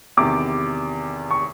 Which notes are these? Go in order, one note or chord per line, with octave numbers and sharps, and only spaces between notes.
E2 C3 D#3 D6
C#6